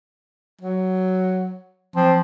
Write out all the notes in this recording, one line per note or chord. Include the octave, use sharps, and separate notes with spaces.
F#3
F3 C4